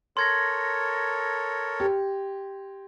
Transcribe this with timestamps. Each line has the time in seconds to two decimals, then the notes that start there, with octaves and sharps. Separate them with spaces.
0.17 A4 A#4 C#5 C6 G#6 A#6
1.80 G4